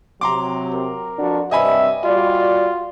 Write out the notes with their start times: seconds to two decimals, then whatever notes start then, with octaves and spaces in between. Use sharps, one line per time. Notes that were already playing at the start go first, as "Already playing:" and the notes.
0.21 C3 F#3 A#5 C6 D6
0.74 A#4
1.18 F2 D4 F#4
1.51 G2 C3 C4 D#5 E5 G#5 B5
2.05 G3 F4 F#4 D5